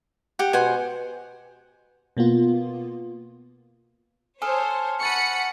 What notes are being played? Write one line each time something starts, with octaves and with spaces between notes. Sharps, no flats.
G4 F#5
B2 C5 F#5 G#5
B2 A#3 B3 F4
A4 C5 C#5 G#5 D#6 F6
F#5 B5 C#6 A6 C#7 D#7